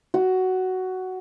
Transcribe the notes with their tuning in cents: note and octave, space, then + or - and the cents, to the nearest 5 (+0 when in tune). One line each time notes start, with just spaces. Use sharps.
F#4 +10